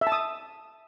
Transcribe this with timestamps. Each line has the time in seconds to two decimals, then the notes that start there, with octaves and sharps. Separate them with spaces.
0.01 E5
0.07 A5
0.12 D#6